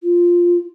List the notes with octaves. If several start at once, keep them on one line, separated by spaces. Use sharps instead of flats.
F4